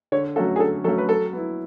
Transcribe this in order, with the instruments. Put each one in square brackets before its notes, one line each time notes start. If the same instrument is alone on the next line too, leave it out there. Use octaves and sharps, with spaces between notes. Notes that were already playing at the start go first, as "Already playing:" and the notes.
[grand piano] D3 [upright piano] C#5
[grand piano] F#3 A3 C#4 F#4 [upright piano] A4
[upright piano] G#4
[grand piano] D3 [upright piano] A4
[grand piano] F#3 A3 C#4 F#4 [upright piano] A4
[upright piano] B4
[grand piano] F#3 [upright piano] A4
[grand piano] B3 E4